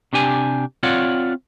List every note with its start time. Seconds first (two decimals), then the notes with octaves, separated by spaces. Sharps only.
0.13 C3 D4 G4 G#5
0.83 C4 F4 C#5 D5 F#5